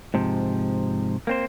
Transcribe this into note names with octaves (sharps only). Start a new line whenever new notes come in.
G#2 C3 F3
A#3 C4 C5